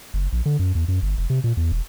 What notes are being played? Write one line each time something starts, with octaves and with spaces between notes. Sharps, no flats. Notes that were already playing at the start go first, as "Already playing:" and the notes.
F#1
A#1
D3
F#2
E2
F#2
G1
F1
C3
A#2
E2
E1